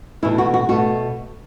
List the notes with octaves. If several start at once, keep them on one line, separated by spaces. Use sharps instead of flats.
E2 B2 A3 E4
F#4
F#4
B2 A3 F#4